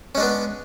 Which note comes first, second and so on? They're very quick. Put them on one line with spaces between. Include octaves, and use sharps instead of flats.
C#4 G#3 D4 B3